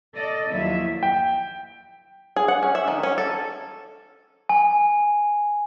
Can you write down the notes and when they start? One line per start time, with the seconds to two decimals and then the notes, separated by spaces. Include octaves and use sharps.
0.16 A4 D5 D#5
0.53 D#2 F3 F#3 E4 E5
1.03 G5
2.36 G#4
2.48 F#5
2.63 C#4
2.75 E5
2.88 D#3
3.03 C#4
3.18 A4
4.49 G#5